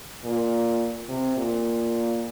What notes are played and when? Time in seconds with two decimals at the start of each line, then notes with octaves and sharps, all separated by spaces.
0.25 A#2
1.09 C3
1.37 A#2